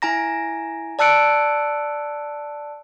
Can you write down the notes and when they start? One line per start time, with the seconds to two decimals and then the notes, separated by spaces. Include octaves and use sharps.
0.02 E4 G#5 A#5 A#6
0.99 D5 A5 E6 F#6 C#7 D7